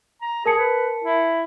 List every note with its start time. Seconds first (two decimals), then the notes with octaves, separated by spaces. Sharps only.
0.22 A#5
0.46 G#4 A#4 A5 C#7
0.58 B4
1.04 E4